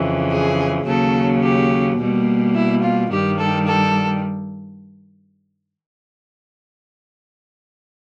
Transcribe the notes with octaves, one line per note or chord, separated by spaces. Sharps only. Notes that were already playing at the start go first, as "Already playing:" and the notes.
Already playing: F2 C#3 E3
G#4
D#2 C#3 F#3 A4
G4
B2 G3 A#3
E4
F4
G2 D#3 G3 G4
A4
A4